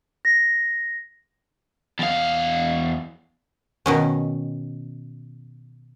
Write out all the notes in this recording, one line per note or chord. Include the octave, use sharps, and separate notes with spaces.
A#6
E2 F5
B2 D#3 C#4